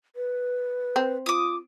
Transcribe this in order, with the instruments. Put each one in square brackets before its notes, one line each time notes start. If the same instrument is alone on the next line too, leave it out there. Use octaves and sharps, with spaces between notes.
[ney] B4
[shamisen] C4
[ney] F4 [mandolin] D6 D#6